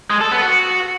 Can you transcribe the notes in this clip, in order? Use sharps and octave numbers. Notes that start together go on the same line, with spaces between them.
G#3
A4
B3
F#4